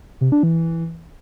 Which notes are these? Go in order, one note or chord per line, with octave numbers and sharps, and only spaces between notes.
C3
D4
E3